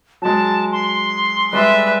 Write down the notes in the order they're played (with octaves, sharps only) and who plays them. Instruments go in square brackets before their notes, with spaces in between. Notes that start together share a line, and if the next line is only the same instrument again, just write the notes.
[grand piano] F#3 G#3 [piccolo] A5
[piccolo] C6
[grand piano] G3 G#3 D5 [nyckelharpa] B4 E5